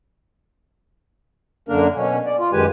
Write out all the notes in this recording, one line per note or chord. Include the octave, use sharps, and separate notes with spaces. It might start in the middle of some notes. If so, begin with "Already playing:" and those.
F#2 D3 A#3 D4 A#4
B2 C#4
D5
F4
F#2 D#3 G#3 G4 B4 G#5